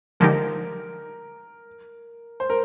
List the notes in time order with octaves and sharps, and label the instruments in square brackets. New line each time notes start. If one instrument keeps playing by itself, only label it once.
[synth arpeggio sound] D3 F3 G#3 D#4 G4 [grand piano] A#4
[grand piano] C5
A#4